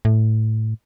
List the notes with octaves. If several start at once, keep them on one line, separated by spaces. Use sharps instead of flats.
A2